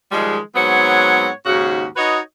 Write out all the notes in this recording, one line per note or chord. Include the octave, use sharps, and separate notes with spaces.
D#3 F3 G3 G#3
G#2 F#3 B3 C4 C#5 F#5
D#2 G#2 C#3 F#4
D#4 F#4 B4 C#5 D#5